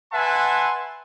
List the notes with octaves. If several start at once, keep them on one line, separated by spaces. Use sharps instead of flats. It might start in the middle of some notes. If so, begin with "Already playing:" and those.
B4 E5 F#5 G#5 A5 C6